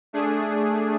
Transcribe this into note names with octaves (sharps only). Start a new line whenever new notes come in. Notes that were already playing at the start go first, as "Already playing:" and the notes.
A3 D4 G#4